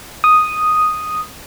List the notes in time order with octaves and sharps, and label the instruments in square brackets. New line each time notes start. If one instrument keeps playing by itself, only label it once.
[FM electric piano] D#6